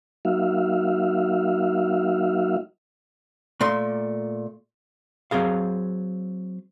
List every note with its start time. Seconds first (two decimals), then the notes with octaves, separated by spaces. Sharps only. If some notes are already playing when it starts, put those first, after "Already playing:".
0.25 F#3 A#3 D#4 F#4 E5 F5
3.61 A#2 A3 C6
5.31 F#3 C4 G#4 F5